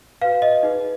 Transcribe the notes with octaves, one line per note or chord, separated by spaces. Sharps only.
F#4 B4 F5
D#5
D#4 G#4 B4